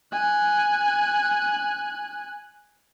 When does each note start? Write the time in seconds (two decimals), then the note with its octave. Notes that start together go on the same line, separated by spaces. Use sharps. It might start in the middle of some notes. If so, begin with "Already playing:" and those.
0.12 G#5 F#6